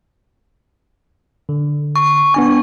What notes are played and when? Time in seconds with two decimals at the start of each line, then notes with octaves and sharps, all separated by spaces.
1.49 D3
1.96 C#6
2.34 B3 D4 G#5 C#6